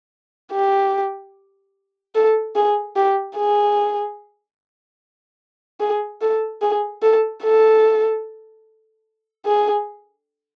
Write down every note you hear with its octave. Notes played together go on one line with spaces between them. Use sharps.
G4
A4
G#4
G4
G#4
G#4
A4
G#4
A4
A4
G#4